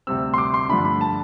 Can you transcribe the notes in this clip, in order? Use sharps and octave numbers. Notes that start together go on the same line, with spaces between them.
D2 C3 G3 C4 E6
C6
D6
C6
G2 D3 F3 A3 D4 B5
B5
A5